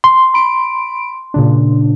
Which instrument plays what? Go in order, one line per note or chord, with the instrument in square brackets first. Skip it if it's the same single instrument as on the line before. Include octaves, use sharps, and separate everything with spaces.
[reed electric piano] C6
[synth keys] B5 D7
A#2 C#3 D4